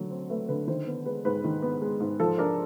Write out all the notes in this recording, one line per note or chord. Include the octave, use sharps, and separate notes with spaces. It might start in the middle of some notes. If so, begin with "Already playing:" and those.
Already playing: D3 F#3 A3
C4
A3 B4
D3 B4
D#3 C5
B3
G#3 B4
G#2 B4
D#3
B3
G#3
G#2
F3 A4
D4 A#4